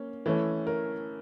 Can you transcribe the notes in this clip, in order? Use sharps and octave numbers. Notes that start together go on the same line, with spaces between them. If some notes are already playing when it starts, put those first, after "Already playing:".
Already playing: A#3 C#4
E3 A3 C#4
A#4